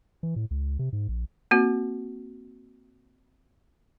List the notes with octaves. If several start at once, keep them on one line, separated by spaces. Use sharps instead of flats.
E3
A2
C#2
C3
G#2
A#1
A#3 C4 F#4